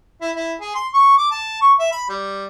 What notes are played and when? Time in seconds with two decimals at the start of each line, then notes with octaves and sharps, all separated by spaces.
0.21 E4
0.35 E4
0.61 G#4
0.75 C6
0.94 C#6
1.17 D6
1.31 A5
1.61 C#6
1.79 E5
1.92 B5
2.09 G3